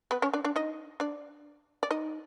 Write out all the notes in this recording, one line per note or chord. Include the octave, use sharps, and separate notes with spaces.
B3 B4
C#4 C#5
D4 D5
D4 D5
D#4 D#5
D4 D5
D5
D#4 D#5